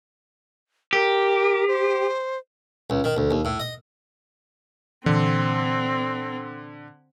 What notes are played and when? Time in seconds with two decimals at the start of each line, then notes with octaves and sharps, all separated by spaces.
0.93 G4 A#4
1.68 C5
2.90 C#2
3.04 D#3
3.17 D2
3.31 D#2
3.45 A2
3.60 D#5
5.06 A#2 D3 E3 C4